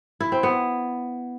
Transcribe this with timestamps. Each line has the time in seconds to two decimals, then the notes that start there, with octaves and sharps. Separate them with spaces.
0.20 E4
0.32 C4
0.43 B3